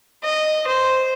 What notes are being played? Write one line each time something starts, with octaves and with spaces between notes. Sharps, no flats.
D#5
C5